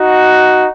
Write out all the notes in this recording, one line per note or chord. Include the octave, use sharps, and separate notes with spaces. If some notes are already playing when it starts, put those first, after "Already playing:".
Already playing: D#4 F#4